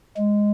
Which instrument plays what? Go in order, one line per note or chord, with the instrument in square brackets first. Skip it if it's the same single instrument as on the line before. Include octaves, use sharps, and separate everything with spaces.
[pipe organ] G#3